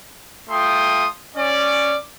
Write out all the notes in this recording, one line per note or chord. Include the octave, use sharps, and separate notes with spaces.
A3 F4 G5 C6 D#6
C#4 D5